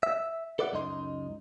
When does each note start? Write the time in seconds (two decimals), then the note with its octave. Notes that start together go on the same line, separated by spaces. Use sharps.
0.03 E5
0.59 A4 B4 D5 E5 F#5
0.72 C#2 F#2 D#4 D#5 C6